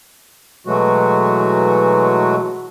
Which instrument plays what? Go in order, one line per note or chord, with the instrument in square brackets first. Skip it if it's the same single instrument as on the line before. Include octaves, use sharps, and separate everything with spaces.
[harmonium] B2 E3 F#3 G#3 A3 F#4